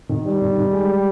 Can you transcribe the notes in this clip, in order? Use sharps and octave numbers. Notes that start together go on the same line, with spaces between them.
D#3
G3 D#4
D#3
D#3
G#3
G#3